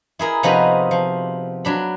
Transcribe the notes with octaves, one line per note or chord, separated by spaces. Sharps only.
E4 G#4 A#4
C3 F3 B3 D#4 F#4 D#5
F3
F#3 D4 B5